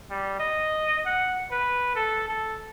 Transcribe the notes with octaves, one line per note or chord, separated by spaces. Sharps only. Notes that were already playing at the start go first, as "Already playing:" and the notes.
G3
D#5
F#5
B4
A4
A4